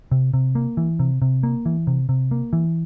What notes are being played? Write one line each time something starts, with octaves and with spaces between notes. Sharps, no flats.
C3
C3
A#3
E3
C3
C3
A#3
E3
C3
C3
A#3
E3